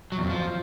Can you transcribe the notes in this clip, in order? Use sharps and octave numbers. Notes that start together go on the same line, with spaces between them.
F#3
E2
F2
F3